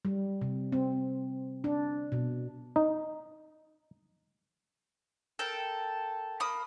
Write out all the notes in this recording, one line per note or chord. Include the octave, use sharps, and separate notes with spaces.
G3
C3
C4
D4
B2
D#4
A4 A#4 G5
A#3 B5 D#6